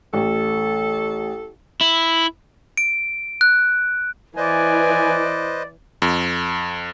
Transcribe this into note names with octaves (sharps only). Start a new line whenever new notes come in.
A1 A4
E4
D7
F#6
E3 B4 C5 D5 D#5 G#5
F2